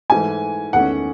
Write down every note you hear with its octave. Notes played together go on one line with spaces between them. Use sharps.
G#2 E3 A3 G#5
E2 D#3 A3 C#4 F#5